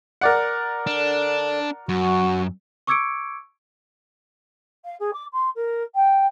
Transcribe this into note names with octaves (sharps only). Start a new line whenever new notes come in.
A#4 D5 F#5
D3 D4
F#2 F#4
C#6 D6 E6 G#6 C#7 D7
F5
G#4
D6
C6
A#4
G5